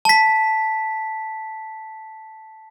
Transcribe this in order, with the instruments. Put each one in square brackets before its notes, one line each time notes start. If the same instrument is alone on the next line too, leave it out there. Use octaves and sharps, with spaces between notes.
[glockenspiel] A5 B6